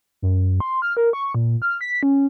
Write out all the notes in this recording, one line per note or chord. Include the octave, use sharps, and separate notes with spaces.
F#2
C6
F6
A#4
C#6
A#2
F6
B6
C#4